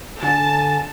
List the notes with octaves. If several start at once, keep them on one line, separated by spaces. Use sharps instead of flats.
D3 G#5 A5